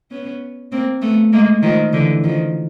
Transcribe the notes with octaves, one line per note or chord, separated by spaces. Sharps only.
B3 C#4
A#3 C4
A3 B3
G#3 A#3
D#3 F3
D3 E3
D#3 F3